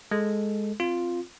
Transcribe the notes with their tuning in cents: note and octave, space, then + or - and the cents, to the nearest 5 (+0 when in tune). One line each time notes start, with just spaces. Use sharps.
G#3 +0 A4 +0
C4 +0 F4 +0